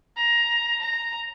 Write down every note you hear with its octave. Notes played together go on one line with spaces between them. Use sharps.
A#5
A#5